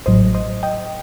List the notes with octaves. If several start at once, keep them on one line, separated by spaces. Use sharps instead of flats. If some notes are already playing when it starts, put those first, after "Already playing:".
A1 A2 F#3 C5 D#5
C5 D#5
D#5 G5